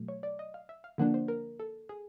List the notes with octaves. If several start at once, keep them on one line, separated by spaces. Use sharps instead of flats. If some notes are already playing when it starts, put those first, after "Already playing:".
Already playing: B2 F#3 A3
C#5
D5
D#5
F5
E5
F5
D3 F3 A#3 D4 F#5
C5
A#4
A4
G#4